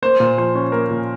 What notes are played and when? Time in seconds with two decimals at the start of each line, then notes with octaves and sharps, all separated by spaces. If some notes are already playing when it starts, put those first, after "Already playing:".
0.02 A#3 C5
0.20 A#2
0.38 F3 C5
0.55 C#4
0.72 A#3 A#4
0.91 A#2